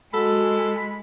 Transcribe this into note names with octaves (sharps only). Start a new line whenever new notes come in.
G#3 F#4 A4 B5